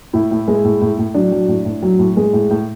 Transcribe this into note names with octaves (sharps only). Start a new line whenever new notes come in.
A2 E4
A2
G#3
A2
A2
A2
F#3 D4
F#3
A2
A2
F#3
A2
G#3
A2
A2